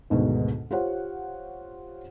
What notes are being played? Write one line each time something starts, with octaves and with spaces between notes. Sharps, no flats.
D2 G#2 B2 D3 D#3 B3
F4 G4 C5 C#5 F#5